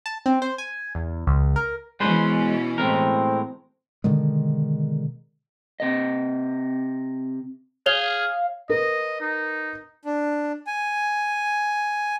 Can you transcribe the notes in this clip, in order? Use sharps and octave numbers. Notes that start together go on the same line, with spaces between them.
A5
C4
C5
G#5
E2
C#2
A#4
B2 E3 G#3 C#4 B4 C5
A2 G#3 C4 A#4
B2 D3 D#3 G#3
C3 D#5
G#4 C#5 F5 F7 G7
A#4 B4 D#5
D#4
D4
G#5